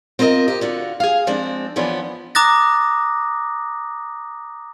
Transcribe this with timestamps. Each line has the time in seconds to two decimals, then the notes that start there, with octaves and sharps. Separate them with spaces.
0.19 C4 F4 A#4 D5 D#5
0.48 G4 D#5
0.61 D3 F4 F#4
1.00 G#4 F5
1.27 F3 G#3 C4 D4
1.76 E3 F3 B3 C#4 D4 F4
2.35 A#5 D6 D#6 F#6 A6 A#6